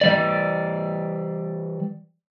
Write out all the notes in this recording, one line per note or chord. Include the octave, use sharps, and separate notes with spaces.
E3 G3 D5